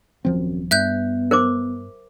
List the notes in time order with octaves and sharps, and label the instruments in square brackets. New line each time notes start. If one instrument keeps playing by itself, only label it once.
[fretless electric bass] D#1 F3 C4 [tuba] F#2
[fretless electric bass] G2 [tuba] B3 [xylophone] E5 F#6 G6
[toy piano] A#4 C5 D6